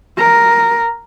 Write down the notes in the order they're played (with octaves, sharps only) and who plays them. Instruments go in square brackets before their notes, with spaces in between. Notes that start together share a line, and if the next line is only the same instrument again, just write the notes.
[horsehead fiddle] A#4